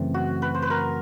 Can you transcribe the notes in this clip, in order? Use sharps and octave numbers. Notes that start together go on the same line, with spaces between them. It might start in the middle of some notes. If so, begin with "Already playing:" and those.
Already playing: F#2 C#3 E3 A3 C4
F#4
B4
C5
B4
A#4